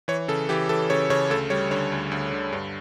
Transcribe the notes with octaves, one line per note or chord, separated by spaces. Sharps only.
E3 C#5
C#3 A4
E3 G4
E3 A4
C#3 C#5
C#3 C#5
D2 A4
G3 C#5
D3 C#5
D2
D2
D3
G2